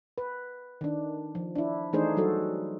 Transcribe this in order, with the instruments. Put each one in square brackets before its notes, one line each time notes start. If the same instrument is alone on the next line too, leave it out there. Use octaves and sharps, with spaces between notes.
[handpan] B4
D#3 D4
F3
D4 E4
E3 A3 D4 D#4 G#4 C5
F#3 G3 F#4 A4